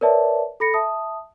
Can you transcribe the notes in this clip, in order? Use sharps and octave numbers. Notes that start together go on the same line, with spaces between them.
A#4 B4 C#5 D5 E5 A5
A4 B5 A#6 C#7
E5 A5 D#6